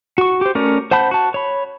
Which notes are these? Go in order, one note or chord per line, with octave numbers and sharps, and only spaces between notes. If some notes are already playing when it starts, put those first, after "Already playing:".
F#4 C#6
G4 C5
A3 C#4 A#4 C#5 D5
C5 F#5 A5 B5 G6
F#4 A5
C#5 B5